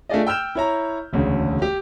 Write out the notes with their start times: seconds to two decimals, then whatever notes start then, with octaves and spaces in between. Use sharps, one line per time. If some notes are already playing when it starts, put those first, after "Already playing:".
0.09 A3 D4 F4 G#4 D5 D#5
0.27 G5 E6 F6 G6 E7
0.55 E4 C#5 A#5
1.13 E1 D2 C#3
1.62 G4